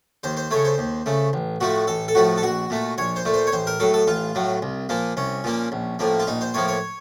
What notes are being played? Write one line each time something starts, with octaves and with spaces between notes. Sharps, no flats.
D#2 C5
C5
C#3 A3 C#5
C5
D#2
C#3 A3
A1
A2 F3 A3 F#4
A1 A4
A4
A2 F3 A3 F#4
A4
A#1 F#4
A#2 A3
A#1 C#5
C5
A#2 A3
C5
C#5
A1 C5
A#4
A2 F#3 A4
A4
A1 F4
A2 F#3
C2
A#2 F3 A#3
C2 C#4
A#2 F3 A#3
A#1
A2 F3 A#3
F4
A#1 D#4
C5
A2 F3 A#3 C#5
C#5